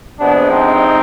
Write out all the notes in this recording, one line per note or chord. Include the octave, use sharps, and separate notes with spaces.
C3 F3 G#3 B3 D4
C4 D#4